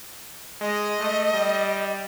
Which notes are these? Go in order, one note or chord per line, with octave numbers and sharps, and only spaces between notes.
G#3 D#5
A3
G3